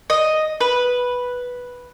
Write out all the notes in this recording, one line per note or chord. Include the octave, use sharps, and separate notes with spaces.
D#5
B4